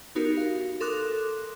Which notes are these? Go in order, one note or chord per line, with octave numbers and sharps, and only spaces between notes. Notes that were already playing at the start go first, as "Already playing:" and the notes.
B3 D#4 F#4 G4 A#4
F5
A4 A#4 C6 D6 D#6 F#6